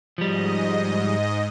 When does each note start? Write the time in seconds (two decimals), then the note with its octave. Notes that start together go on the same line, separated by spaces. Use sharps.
0.18 G#2 F3 G3 D#5